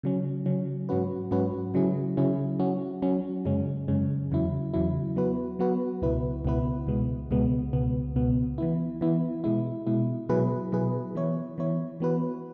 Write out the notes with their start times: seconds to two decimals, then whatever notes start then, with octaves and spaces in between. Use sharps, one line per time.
0.03 C#3 F#3 C#4
0.46 C#3 F#3 C#4
0.89 G#2 F#3 C#4 F#4 B4
1.31 G#2 F#3 C#4 F#4 B4
1.74 C#3 F#3 C#4 E4 G#4
2.17 C#3 F#3 C#4 E4 G#4
2.59 F#3 C#4 F#4
3.02 F#3 C#4 F#4
3.45 F#2 C#3 G#3 C#4
3.88 F#2 C#3 G#3 C#4
4.31 E2 C#3 F#3 E4
4.74 E2 C#3 F#3 E4
5.16 F#3 B3 F#4 B4
5.59 F#3 B3 F#4 B4
6.02 C#2 B2 B3 E4 B4
6.45 C#2 B2 B3 E4 B4
6.87 C#2 B2 G#3 B3
7.30 C#2 B2 G#3 B3
7.73 C#2 B2 B3
8.16 C#2 B2 B3
8.58 E3 B3 E4
9.01 E3 B3 E4
9.44 B2 G#3 E4
9.87 B2 G#3 E4
10.29 B2 F#3 E4 G#4 B4
10.72 B2 F#3 E4 G#4 B4
11.15 E3 B3 E4 C#5
11.58 E3 B3 E4 C#5
12.00 E3 B3 F#4 B4